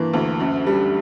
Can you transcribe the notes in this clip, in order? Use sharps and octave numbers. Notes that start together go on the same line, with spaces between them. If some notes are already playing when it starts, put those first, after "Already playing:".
Already playing: G2 E3 A#3
D2
F#2
G3